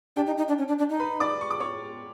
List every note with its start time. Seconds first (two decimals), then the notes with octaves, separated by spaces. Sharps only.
0.16 D4 G4 G5
0.27 D#4
0.38 D#4
0.48 D4
0.58 C#4
0.68 D4
0.79 D4
0.90 D#4
1.00 B4 B5
1.20 D5 D6
1.41 C#6
1.51 D6
1.60 C#5 C#6